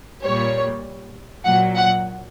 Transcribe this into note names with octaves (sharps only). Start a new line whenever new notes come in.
A#2 G3 C#5
A#2 F#3 F#5
F#5